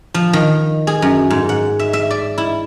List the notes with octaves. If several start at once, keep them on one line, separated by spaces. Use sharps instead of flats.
F3
D#3
G#4
F#2
G#2
F#5
E5
E5
D5
E4